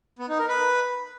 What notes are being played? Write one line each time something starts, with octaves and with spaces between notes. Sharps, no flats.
B3
D#4
A#4
B4